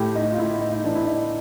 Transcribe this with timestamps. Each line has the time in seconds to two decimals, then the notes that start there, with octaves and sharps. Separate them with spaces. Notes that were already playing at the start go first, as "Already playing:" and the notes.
Already playing: A2 G4
0.15 D#4
0.32 F4
0.38 A2 E4
0.61 D#4
0.72 D#4
0.84 E3 D4
0.95 E4
1.06 D#4